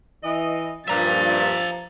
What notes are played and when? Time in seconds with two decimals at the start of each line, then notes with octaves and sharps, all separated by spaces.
0.23 E3 D#5
0.87 G2 A#2 F3 E5 A#5 A6